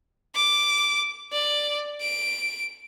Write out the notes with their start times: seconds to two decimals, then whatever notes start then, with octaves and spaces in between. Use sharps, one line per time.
0.35 D6
1.32 D5
2.01 D7